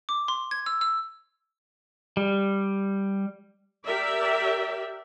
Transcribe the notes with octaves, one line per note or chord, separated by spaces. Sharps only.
D6
C6
G#6
E6
E6
G3
G4 A#4 D5 E5